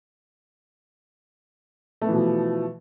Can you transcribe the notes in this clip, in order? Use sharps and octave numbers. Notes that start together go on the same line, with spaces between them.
B2 E3 F3 A3 B3